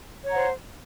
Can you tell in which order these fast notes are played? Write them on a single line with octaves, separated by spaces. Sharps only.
C#5 A#5 F#5 C5